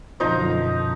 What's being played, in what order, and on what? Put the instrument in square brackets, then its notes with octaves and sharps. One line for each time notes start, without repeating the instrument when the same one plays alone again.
[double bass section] F#2 B2 D3 [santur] F3 D#4 A#5